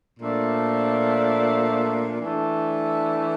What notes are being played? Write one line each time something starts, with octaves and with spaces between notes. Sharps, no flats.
A#2 F3 A3 D4
E3 A3 D4